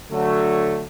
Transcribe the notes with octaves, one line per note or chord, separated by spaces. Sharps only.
D3 F#3 A3